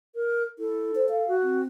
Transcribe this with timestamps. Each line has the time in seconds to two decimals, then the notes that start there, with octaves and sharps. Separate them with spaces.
0.15 A#4
0.59 E4 A4
0.95 C5
1.09 F5
1.28 F#4
1.43 C4